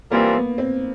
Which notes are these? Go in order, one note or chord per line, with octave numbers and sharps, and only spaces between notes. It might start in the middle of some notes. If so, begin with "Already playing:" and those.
E3 G3 A#3 C4 F4 A#4
B3
C4